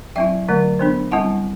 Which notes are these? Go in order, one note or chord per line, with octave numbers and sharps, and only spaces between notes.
F#3 C4 E4 E5 G5
D3 F#3 A3
E3 B3 D4
G3 C4 E4 F#5 A5